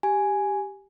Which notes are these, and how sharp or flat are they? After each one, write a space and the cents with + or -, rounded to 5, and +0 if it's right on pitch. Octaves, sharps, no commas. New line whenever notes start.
G4 +0 G#5 +0